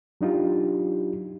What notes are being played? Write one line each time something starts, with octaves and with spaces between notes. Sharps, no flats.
F#3 D4 D#4 F4 G4